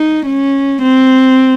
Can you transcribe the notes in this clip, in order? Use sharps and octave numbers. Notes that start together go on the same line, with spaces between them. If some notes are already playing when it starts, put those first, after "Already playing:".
Already playing: D#4
C#4
C4